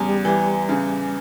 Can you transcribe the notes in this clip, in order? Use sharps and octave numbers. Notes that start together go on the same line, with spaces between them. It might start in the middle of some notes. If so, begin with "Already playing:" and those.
Already playing: E2 C#3 G3
E3
C#3